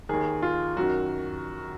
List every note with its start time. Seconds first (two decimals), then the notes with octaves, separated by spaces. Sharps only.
0.09 D#2 D#3 G#4
0.42 F4
0.77 F#2 D#3 F#4